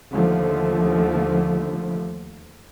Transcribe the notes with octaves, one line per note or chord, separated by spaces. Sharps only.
D#2 D3 F3 A3